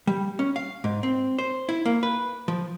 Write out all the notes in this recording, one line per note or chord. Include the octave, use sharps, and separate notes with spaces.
G3
C#4
F5
G#2
C4
C5
E4
A#3
B4
F3